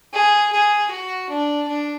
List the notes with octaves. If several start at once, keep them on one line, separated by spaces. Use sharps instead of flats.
G#4
G#4
F#4
D4
D4